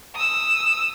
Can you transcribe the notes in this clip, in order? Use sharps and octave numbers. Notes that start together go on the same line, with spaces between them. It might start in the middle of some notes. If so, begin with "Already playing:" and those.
D#6 E6